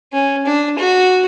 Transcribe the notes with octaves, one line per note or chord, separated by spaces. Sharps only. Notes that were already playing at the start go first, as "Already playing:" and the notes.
C#4
D4
F#4